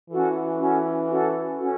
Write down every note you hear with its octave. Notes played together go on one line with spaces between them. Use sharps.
E3 C#4 F#4 A4
C#4 F#4 A4
C#4 F#4 A4
C#4 F#4 A4